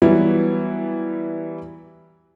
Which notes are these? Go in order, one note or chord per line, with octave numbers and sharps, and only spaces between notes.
E3 F#3 G3 B3 E4